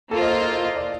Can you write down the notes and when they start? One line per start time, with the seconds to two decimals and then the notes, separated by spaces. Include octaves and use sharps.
0.11 A#3 F4 A4 C5
0.21 D#5
0.31 F5
0.41 D#5
0.51 D#5
0.64 D#5
0.77 D5